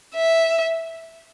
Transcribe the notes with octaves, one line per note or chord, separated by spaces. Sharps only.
E5